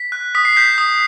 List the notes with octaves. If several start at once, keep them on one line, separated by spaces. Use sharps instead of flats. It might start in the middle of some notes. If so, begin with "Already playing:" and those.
Already playing: B6
F#6
D#6 B6
C7
G6 B6
D#6